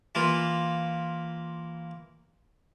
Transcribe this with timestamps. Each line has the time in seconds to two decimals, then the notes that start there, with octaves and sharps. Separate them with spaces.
0.15 E3 A#3 F4